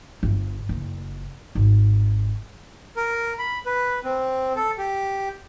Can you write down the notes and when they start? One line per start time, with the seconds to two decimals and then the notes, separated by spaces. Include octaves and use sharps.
0.23 G1
0.69 F#1
1.55 G#1
2.97 A#4
3.39 B5
3.66 B4
4.04 C4
4.56 A4
4.78 G4